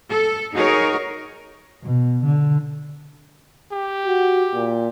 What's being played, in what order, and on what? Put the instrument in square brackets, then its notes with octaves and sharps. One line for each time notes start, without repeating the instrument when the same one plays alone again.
[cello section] A4
D#4 F#4 G#4 A#4 C#5
[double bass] B2
D3
[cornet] G4
[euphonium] F#4
A#2